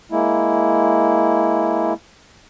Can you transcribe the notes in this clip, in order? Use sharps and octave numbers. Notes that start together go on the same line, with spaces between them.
G#3 A#3 E4